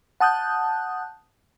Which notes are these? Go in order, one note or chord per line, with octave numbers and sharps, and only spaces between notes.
F#5 A5 D#6 F#6 G6